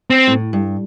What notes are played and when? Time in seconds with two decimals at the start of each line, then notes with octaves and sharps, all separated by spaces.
0.10 C4
0.27 A2
0.53 G2